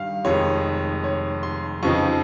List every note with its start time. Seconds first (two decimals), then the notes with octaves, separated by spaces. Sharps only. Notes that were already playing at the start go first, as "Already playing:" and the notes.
Already playing: G2 D#3 G3 F5
0.25 F1 F2 D#3 G#3 C#5
1.04 C#5
1.43 C6
1.83 F2 C#3 F3 C4 D#4 C#6